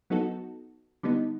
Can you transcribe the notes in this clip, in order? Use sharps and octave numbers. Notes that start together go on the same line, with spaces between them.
F#3 B3 D#4 F#4 A4
D3 G3 B3 D#4